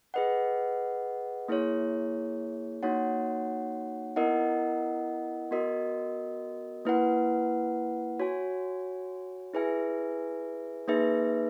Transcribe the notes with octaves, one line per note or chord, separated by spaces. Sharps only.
G#4 B4 D#5 F#5
A#3 E4 G#4 C#5
A#3 D#4 F#4 C#5 F#5
B3 E4 A#4 D#5 F#5
B3 F#4 A#4 D#5
A#3 E4 B4 F#5
F#4 C#5 G#5
E4 G#4 B4 E5 G#5
A#3 D#4 G#4 B4 E5